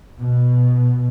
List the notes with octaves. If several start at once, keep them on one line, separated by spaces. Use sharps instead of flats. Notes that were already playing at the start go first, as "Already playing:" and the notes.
B2